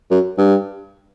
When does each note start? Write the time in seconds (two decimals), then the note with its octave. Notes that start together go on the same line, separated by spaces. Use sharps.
0.11 F#2
0.38 G2